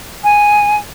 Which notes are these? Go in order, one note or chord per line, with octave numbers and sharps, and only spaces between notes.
G#5